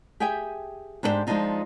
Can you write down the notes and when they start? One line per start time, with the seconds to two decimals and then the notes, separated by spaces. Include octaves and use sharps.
0.20 G4 G#4 E5 G5 G#5
1.03 G#2 D4 E4 G4 C5
1.27 F3 G#3 A3 D4 D#4 F4